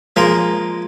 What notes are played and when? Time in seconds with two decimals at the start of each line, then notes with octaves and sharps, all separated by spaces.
0.16 F3 G#3 A#3 A#4